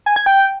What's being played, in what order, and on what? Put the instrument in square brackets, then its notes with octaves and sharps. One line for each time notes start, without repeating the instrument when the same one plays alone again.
[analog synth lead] G#5
G#6
G5